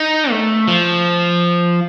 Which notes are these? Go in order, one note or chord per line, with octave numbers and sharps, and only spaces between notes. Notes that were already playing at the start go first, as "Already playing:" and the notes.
Already playing: D#4
A3
F3